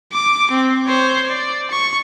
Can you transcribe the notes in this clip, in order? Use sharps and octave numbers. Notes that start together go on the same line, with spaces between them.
D6
C4
C5 C#5
D5
C#6